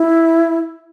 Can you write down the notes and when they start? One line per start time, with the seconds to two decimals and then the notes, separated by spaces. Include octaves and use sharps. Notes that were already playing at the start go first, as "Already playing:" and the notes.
Already playing: E4